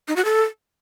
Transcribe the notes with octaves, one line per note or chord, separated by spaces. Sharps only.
D#4
F#4
A4